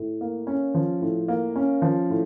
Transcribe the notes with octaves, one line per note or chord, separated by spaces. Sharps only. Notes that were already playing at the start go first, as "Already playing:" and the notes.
Already playing: A2
A#3
C#4
F3
A2
A#3
C#4
F3
A2